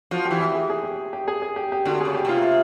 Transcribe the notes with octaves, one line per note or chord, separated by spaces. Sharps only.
F3 F#4
G4
E3
G4
G#4
G#4
G4
G4
G#4
G#4
G4
G4
D3 F#4
C#3 G#4
G4
C3 F4